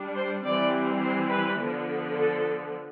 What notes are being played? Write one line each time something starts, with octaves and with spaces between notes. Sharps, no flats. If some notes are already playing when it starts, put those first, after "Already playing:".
Already playing: G3 D4
C5
E3 G3 C4 D5
C5
B4
D3 F3 B3
A4